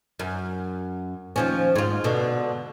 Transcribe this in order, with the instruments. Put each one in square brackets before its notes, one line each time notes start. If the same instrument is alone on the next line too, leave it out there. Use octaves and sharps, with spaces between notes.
[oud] F#2
D#2 F3 C#4
G#2 F4
B2 D3